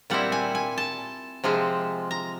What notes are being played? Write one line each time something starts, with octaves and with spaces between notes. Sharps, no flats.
A#2 G3 C4 E4 F#5
G#5
G#5
A5
C3 F3 G#3 C4
A#5